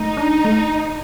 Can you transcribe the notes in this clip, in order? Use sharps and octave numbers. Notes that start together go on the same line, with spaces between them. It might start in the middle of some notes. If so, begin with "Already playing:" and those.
Already playing: A3 D#4
D4
A3